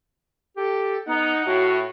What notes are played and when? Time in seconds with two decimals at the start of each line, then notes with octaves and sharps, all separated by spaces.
0.57 G4 A4
1.07 B3 D#4 F#5
1.46 A2 F#4